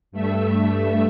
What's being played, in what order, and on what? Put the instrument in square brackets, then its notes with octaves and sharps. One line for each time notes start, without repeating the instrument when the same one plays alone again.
[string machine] G2 A3 E5